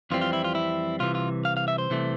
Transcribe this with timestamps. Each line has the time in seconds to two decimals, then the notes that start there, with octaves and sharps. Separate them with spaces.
0.11 F2 E3 G3 C4 F4
0.21 F4
0.33 E4
0.44 F4
0.55 E4
1.00 C2 C3 E3 F4
1.15 F4
1.45 F5
1.57 F5
1.68 E5
1.78 C5
1.90 C2 C3 E3 A3